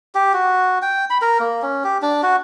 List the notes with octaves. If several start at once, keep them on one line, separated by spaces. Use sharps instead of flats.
G4
F#4
G5
B5
A#4
A#3
C#4
G4
D4
F#4